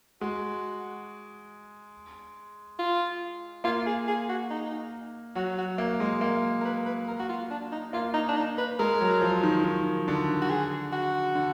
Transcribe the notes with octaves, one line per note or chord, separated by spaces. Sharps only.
G#3 F#4
F4
A#3 F4
G#4
G#4
F#4
D#4
F#3 F#4
F#4
A#3
G#3 D#5
A#3 F5
A#4
B4
B4
A#4
F#4
F4
D4
D#4
A#3 F4
D#4
D4
D#4
B4
G#3 A#4
F#3
F3
D#3
D#3
D3
F#4
G#4
F#4
D3